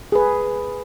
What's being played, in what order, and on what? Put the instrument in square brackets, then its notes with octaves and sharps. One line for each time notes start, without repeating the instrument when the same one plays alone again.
[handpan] G#4 B4